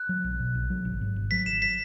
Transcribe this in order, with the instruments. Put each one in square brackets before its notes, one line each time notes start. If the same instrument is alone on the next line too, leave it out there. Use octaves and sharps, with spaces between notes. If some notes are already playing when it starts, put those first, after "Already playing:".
Already playing: [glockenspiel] F#6
[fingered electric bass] F#3
B1
B2
B1
F#3
G#1
G#2
G#1
[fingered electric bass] F#3 [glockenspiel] B6
[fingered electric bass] G#1 [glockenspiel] E7
[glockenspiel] B6